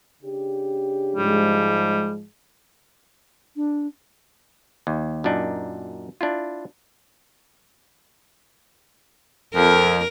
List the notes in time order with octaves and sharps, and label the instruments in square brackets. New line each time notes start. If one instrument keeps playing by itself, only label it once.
[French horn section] C#3 D4 G4
[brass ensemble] G#2 F3 G#3 [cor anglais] G3
[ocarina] D4
[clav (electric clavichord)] D#2
F#2 A#2 D4 D#4
D4 E4 F4
[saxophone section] F2 [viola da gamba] A#4